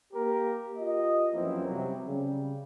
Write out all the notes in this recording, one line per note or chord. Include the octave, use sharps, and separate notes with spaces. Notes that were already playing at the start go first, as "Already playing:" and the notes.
A#3 G4 A#4
F4 G4 A#4 D#5
F#2 E3 F3 A#3 C4 E4
C3 F#3 G3
C#3 G3